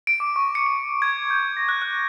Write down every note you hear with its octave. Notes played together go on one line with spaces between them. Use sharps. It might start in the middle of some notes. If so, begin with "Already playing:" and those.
D7
D6
C#6
C#7
C#7
G#6
G6
A#6
F#6
F#6